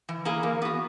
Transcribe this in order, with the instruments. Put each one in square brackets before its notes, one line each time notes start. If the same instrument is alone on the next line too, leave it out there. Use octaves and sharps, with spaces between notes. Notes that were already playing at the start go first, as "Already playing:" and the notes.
[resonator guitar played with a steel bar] E3
A#3 E4 G#4
[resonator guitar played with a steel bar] E3 [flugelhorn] A#3
[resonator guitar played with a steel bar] B3 F#4